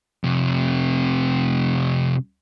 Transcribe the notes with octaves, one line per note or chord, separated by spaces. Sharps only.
F2 C3